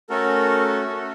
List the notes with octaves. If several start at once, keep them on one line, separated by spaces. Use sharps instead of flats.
A3 C#4 F#4 A4 A#4
A3 C#4 F#4 A4